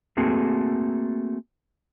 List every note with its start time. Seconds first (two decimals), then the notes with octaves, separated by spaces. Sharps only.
0.17 A3 A#3 C4 F#4 G#4 A4